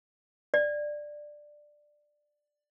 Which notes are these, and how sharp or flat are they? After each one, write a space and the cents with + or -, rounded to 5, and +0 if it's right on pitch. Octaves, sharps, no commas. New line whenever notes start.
D5 +10